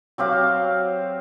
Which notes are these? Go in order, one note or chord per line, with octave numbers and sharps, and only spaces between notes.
F#3 C4 G4 F5